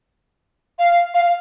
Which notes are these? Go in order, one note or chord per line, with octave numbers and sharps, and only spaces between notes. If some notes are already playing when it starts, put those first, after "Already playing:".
F5
F5